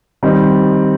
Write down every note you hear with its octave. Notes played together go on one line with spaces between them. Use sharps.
D#3 G3 C4 D#4